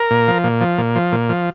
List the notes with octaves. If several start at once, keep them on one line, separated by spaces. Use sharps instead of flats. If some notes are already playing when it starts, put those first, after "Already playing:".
Already playing: A#4
A#2
F3
A#2
F3
A#2
F3
A#2
F3